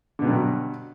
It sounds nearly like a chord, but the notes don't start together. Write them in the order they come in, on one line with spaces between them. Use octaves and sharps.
D3 B2 G2 F#3